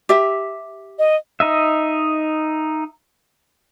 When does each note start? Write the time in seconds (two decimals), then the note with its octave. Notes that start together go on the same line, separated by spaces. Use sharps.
0.09 G4 E5
0.99 D#5
1.40 D#4 D#5 E5